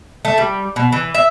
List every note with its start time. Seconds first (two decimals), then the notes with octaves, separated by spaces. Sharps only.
0.25 A3
0.38 G3
0.76 B2
0.92 E3
1.15 E5